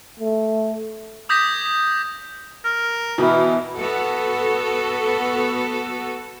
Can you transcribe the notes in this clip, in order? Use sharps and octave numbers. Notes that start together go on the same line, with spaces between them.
A3
D6 D#6 G6 G#6 A#6 B6
A#4
B2 E3
B3 F#4 A4